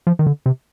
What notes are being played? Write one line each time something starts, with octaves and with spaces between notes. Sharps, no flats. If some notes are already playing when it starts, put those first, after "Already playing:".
F3
D#3
D3
C3